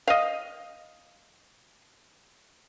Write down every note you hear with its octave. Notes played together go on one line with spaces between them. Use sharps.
D#5 F5